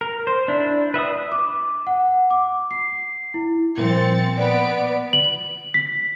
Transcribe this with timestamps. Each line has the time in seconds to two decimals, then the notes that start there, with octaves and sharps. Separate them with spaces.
0.01 A#4
0.27 C5
0.48 D4 E4
0.94 B4 E5 F#5 D#6
1.32 D6
1.87 F#5
2.30 D6
2.71 C7
3.34 E4
3.78 A#2 F3 G3 C4 A#4 A6 C#7
4.37 B3 B4 D5 D7
5.13 F#7
5.74 B6